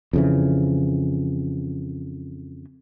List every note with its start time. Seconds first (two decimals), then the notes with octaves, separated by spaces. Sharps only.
0.13 F2 C#3 E3